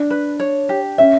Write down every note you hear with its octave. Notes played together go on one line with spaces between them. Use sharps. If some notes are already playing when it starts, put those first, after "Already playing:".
Already playing: D4
B4
C#5
G4
C#4 E5